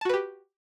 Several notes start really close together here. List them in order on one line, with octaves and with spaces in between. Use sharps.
A5 F#4 B4 G4